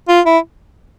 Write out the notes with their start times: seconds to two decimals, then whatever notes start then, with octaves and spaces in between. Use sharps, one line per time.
0.09 F4
0.26 E4